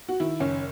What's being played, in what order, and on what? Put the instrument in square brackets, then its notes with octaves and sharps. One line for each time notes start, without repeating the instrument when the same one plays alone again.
[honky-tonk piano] F#4
D#3 E4
F#1 C#4